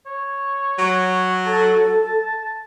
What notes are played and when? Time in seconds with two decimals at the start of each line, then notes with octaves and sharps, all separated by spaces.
0.06 C#5
0.79 F#3
1.46 A4 A5